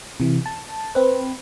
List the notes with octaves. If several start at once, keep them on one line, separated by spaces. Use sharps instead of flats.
C3 E3
A5
C4 B4